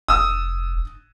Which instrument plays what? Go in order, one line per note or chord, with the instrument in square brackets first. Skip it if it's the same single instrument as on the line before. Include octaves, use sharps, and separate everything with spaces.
[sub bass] F1 [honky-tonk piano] D#6 E6